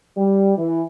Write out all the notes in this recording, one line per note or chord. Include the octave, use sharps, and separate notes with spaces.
G3
E3